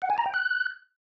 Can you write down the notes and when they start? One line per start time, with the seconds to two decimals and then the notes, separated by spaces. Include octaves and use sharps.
0.02 F#5
0.10 G#5
0.18 A#5
0.26 G5
0.34 F#6